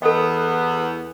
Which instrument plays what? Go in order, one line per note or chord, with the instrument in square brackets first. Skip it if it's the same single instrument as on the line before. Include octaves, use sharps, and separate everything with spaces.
[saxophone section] E2 B3 [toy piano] A4 D#5